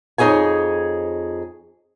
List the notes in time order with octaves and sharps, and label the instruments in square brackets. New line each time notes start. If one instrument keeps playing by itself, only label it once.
[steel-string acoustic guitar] F2 D#4 G#4 C#5 G#5